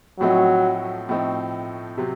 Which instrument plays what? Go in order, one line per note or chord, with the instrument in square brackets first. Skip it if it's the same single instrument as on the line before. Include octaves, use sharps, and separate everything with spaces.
[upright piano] A2 F3 A3 C4 D#4 [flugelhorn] F#3
[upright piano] A2 F3 A3 C4 D#4
C3 F#3 C4